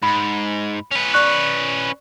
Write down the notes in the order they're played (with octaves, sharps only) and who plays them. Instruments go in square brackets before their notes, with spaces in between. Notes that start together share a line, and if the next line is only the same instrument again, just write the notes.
[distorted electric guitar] G#2 [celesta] B5
[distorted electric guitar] C#4 B4
[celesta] D5 C#6 F#6